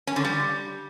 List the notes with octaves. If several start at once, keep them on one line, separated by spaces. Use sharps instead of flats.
C#4
D3
G3